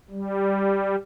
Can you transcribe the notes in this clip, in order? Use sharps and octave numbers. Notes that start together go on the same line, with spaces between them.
G3